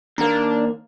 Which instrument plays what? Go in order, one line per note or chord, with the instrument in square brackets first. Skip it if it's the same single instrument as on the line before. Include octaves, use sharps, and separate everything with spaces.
[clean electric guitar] D#2 A#3 [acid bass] D4 [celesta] A#5